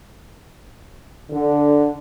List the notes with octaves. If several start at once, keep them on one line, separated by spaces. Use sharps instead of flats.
D3